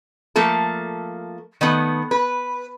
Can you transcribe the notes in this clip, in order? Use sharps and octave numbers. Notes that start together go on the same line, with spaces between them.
F3 A3 A#3 A4
D#3 A3 B3
B4